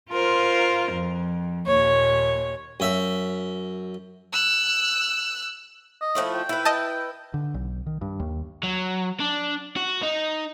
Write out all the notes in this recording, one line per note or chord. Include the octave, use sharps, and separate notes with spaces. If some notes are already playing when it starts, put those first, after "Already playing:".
F4 A#4 C5
F2
D#2 A#2 C#5
F#2 E5
E6 F#6
D#5
F3 A3 E4
G5
E4 B4
D#5 A5
D3
B1
D#3
G2
D#2
F#3
D4
F#4
D#4